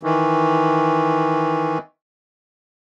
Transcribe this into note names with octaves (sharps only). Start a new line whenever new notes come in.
D#3 E3